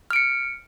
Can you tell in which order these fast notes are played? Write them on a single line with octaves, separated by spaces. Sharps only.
F6 D7 C#7